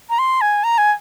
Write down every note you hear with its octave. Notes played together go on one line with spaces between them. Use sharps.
A#5
C6
G#5
A#5
G#5